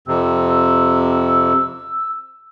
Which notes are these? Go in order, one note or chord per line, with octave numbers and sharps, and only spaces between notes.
F2 C3 E6